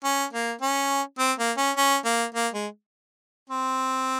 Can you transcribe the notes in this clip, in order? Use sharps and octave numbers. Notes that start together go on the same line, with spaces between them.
C#4
A#3
C#4
C4
A#3
C#4
C#4
A#3
A#3
G#3
C4